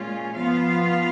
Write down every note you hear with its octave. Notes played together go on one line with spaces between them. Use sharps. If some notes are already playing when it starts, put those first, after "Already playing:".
Already playing: A#2 G#3 C#4 F4
F3 B3 F4 F5